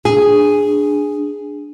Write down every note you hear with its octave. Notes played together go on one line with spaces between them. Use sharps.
D4 G#4